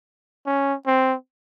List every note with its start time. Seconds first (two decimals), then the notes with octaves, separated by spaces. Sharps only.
0.46 C#4
0.87 C4